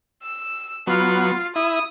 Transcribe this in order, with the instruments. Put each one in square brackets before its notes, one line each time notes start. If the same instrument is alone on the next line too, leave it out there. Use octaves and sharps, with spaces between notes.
[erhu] E6
[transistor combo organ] F#3 B3 [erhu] F4
[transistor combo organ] E4 [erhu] D#6